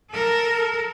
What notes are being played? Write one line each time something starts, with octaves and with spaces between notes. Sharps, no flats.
A4 A#4